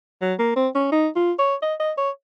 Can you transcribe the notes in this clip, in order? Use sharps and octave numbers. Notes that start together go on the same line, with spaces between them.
F#3
A#3
C4
C#4
D#4
F4
C#5
D#5
D#5
C#5